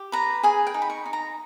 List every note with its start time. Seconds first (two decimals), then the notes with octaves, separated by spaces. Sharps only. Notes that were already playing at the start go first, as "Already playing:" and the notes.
Already playing: G4
0.12 B4 A#5
0.43 G#4 G#5
0.67 G5
0.74 D#4
0.82 B5
0.90 C#6
1.06 D#4
1.13 A#5